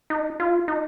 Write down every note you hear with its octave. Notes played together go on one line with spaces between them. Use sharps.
D#4
F4
D#4